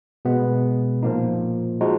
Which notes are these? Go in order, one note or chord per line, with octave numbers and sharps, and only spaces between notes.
B2 G#3 B3
A#2 F3 A#3 D#4
F3 G#3 D#4 F#4